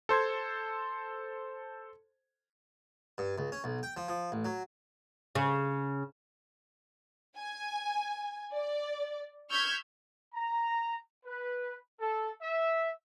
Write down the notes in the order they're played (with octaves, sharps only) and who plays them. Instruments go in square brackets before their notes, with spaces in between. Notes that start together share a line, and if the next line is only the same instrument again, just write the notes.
[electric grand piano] A4 C5 C6 G#6
[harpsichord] G2
C#2
C#4
B1
G5
F3
F3
A1
F#3
[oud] C#3
[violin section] G#5
D5
C#6 E6 F6 G6 G#6 B6
[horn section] A#5
B4
A4
E5